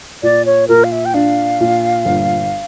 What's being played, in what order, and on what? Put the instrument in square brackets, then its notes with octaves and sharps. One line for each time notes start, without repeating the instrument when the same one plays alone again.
[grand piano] A#2 [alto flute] D5
[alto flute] C#5
[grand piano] A#2 [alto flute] A#4
[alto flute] F5
E5
G5
[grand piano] D4 [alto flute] F5
[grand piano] A#2
G1